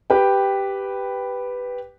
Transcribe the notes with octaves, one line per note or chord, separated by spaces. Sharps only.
G4 B4 G5